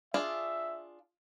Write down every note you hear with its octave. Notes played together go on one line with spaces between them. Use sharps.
D4 F4 G#4 E5